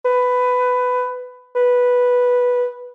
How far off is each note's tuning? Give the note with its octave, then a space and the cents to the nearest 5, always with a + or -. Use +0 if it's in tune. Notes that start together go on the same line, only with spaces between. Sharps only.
B4 +15
B4 -5